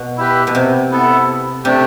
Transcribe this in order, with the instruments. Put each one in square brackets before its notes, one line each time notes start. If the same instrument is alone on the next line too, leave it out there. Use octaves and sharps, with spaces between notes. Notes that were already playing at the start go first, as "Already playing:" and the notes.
Already playing: [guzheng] B2
[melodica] E4 G4 B4
[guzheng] B2
C3
[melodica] B3 E4 A4
[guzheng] C3 [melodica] A3 D4 G4